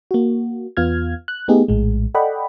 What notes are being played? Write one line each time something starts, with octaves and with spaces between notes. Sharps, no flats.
A#3 F#4
E2 B3 F4 F6 G#6
F#6
A3 B3 D#4 G4 G#4
A#1 A2 G#3
A4 D5 D#5 F#5 G5 B5